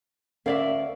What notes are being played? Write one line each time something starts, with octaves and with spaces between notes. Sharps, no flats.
D2 C#4 A#4 D5 E5 F5